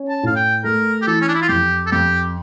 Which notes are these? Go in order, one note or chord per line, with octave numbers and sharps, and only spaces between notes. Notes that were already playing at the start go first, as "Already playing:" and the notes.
Already playing: C#4
A5
A2 F5
G5
A3 A#4
G4
E3 A4
C#4
D4
E4
F4
F2 G4
A4
F2 G4